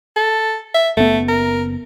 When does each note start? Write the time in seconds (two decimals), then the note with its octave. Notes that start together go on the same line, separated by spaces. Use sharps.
0.17 A4
0.75 E5
0.97 F#1 A3 B3
1.29 A#4